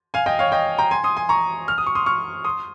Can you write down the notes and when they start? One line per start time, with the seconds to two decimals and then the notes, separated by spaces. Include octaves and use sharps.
0.14 F5 G#5
0.26 D#5 G5
0.39 C#5 F5
0.52 D#5 G5
0.78 G5 A#5
0.91 G#5 C6
1.04 C6 D#6
1.17 G#5 C6
1.29 A#5 C#6
1.68 F6
1.78 D#6
1.87 C#6
1.95 C6 D#6
2.06 C#6 F6
2.44 C6 D#6